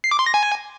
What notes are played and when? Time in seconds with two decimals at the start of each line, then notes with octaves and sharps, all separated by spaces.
0.04 C7
0.11 D6
0.19 C6
0.26 A#6
0.34 G#5